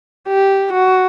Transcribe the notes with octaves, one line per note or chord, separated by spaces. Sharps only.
G4
F#4